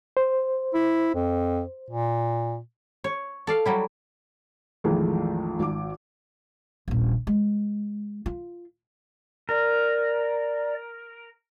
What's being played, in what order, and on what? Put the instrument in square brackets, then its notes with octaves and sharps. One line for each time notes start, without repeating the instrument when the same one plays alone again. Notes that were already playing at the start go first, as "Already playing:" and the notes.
[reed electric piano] C5
[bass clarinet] E4
F2
A#2
[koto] C#5
A4 D5 F5
F#3 G3 E4
[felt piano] A#1 F2 D#3 E3 G#3 A3
G#1 D6
[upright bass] D#1 A#1
G#3
F4
[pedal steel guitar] A#4 [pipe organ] D5